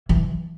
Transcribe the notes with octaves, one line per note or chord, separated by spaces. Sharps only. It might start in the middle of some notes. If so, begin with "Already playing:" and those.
E3